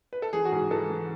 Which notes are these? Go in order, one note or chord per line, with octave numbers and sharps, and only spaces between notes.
B4
A4
E3 G#4
F#4
G#2 G#4
E3 A4
E3